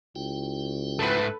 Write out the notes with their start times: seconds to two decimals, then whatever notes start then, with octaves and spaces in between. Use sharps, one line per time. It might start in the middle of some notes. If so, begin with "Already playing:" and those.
0.16 C#2 E4 F#4 G5
0.99 G#2 A3 A4 B4